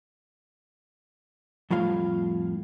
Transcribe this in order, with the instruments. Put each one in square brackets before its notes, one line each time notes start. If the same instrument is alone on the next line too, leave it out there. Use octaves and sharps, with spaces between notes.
[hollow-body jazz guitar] F2 A2 G3 F4 F5